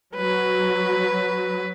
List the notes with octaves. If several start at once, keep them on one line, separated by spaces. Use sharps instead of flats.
F#3 B4